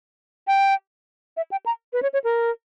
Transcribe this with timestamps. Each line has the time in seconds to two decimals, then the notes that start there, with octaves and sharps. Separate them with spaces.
0.47 G5
1.37 E5
1.51 G5
1.66 A#5
1.93 B4
2.02 C#5
2.13 C#5
2.24 A#4